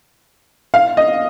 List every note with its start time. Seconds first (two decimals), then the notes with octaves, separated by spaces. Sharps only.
0.74 F5
0.97 D#5